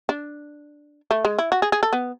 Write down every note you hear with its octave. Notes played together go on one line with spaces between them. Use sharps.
D4
A3
G#3
E4
F#4
G#4
G#4
A4
B3